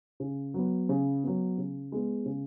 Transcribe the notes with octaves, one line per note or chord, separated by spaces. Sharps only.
C#3
F#3 B3
C#3
F#3 B3
C#3
G#3 B3
C#3